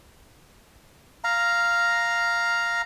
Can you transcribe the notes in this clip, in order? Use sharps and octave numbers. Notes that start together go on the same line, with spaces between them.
F5 A#5